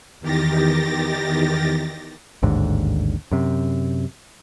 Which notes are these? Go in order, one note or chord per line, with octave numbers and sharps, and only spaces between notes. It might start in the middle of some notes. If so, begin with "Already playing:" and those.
E2 D#3 G4 A6 A#6
A1 D#2 G#2 D3
F#2 C3